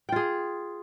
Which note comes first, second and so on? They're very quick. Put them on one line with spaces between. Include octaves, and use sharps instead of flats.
G5 F4 G#4